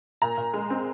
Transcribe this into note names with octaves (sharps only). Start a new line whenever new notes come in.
A#2 A#5
A#2
G#3
C4